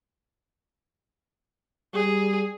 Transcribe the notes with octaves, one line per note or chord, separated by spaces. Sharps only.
G3 G#4